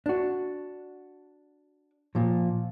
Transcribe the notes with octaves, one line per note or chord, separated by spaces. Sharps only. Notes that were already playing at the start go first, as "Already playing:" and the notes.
D4 F#4
A#2 F3